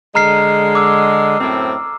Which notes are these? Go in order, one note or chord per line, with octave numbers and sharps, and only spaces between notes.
D3 G#3 A#5 F6 C7
D6 E6
F#2 A2 C4